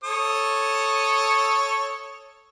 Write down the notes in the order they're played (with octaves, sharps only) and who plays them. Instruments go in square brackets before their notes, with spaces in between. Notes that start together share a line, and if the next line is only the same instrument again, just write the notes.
[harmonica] A4 C#5 D#6